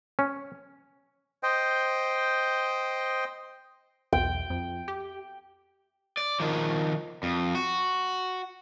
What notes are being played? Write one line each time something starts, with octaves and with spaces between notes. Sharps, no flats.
C#4
C5 D#5 G5
B1 E2 G5
F2
G4
D5
D#3 F3
F2
F#4